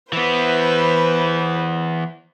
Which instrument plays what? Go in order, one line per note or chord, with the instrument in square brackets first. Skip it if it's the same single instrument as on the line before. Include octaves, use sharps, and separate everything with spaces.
[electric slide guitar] E3 B3 [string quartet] B4 C5